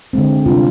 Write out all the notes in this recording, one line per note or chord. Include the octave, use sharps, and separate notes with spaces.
D3 G#3 C4
C3 G3 D4 F4